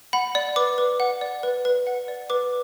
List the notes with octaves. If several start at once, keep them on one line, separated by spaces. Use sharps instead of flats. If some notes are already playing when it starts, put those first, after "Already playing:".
F#5 B5
D5
B4 D6
B4
F#5
D5
B4
B4
F#5
D5
B4 D6